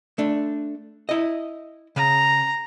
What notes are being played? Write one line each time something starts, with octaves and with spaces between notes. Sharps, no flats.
A3 D4
E4 D#5
C#3 A#5